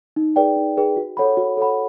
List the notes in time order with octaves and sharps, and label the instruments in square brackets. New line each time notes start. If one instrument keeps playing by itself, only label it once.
[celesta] D#4
G#4 B4 D5 G5
D#4
G#4 B4 D5 G5
F#4
A4 C#5 F#5 B5
F#4
A4 C#5 F#5 B5